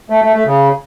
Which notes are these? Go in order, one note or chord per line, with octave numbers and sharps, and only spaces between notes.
A3
A3
A3
C#3